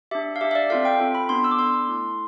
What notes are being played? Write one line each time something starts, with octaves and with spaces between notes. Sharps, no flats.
D4 G4 E5
F5
D4 G4 E5
E5
D5
C4 F4 A4 F5
G5
C4 F4 A4
B5
B3 D4 A4 C6
E6
D6
B3 D4 A4 C6
A3 E4 A4